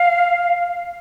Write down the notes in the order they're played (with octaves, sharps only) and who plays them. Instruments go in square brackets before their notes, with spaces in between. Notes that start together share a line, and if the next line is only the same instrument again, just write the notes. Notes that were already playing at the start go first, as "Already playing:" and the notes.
Already playing: [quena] F5